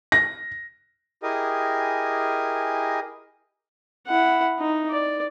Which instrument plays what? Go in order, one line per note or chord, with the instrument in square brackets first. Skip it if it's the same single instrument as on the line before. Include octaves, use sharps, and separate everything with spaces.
[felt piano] A#6
[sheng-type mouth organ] E4 G4 G#4 A#4 D#5 G#5
[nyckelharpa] E4 F#5
D#4
D5